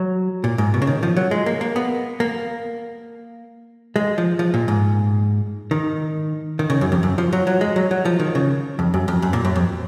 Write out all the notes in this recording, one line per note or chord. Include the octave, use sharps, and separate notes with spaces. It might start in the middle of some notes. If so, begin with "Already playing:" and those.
Already playing: F#3
A#2
G#2
B2
C#3
D#3
F3
F#3
G#3
A#3
A#3
B3
A#3
G#3
F3
F3
A#2
G#2
D#3
D#3
C#3
F#2
F2
F#2
F3
F#3
F#3
G#3
F#3
F#3
F3
D#3
C#3
F2
F#2
F2
F#2
A#2
F#2
F2